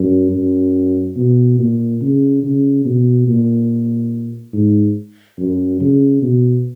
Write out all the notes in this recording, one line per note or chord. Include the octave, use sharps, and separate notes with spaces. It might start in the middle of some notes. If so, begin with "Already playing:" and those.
Already playing: F#2
F#2
B2
A#2
C#3
C#3
B2
A#2
G#2
F#2
C#3
B2